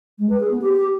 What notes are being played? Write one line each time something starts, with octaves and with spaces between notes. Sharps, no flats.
G#3
B4
G#4
B3
G4